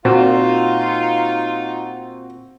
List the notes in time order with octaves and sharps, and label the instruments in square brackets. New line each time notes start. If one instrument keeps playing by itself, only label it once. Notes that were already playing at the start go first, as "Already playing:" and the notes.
[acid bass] A#2 [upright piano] C4 F#4 [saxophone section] D#4 F4